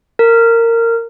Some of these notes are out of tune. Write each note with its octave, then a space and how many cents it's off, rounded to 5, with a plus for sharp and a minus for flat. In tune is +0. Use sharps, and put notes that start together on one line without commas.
A#4 -20